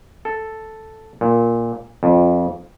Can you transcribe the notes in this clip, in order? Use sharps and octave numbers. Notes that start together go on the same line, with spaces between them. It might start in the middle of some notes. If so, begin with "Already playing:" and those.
A4
A#2
F2